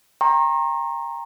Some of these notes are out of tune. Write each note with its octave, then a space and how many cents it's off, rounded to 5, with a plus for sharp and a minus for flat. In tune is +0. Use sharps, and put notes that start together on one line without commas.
G5 +25 A#5 +0 C#6 -45